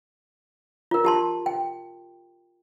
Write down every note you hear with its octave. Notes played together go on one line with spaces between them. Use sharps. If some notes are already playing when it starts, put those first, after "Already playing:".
F4 A#4
G4 A5 C6
G5